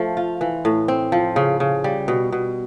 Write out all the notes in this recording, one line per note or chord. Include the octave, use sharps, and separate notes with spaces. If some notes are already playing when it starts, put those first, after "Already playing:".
Already playing: F3 A3
F4
E3
A2
C4
F3
C#3
C#3
G3
B2
B2